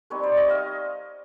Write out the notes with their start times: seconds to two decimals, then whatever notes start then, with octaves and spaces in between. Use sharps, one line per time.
0.10 G3 C4 D#4 B4 C#5
0.23 C5 D5
0.37 C#5 D#5
0.49 D#5 F5